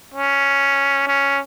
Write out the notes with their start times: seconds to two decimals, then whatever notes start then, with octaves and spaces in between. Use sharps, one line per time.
0.14 C#4
1.07 C#4